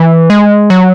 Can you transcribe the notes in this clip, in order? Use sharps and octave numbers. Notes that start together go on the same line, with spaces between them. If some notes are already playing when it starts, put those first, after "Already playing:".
Already playing: E3
G#3
F#3